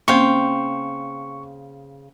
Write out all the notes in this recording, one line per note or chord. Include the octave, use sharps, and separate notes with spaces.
C#3 A#3 C4 C5 F5 G5 C#6